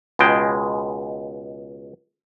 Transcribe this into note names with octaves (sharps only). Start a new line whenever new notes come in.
C#2 B2 G#3 G5